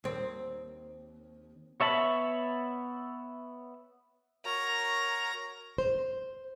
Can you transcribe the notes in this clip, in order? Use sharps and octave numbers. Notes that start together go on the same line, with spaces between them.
D#2 C4
B3 C#5 E5 A5 B5
F#4 A#4 C#5 A#5
C5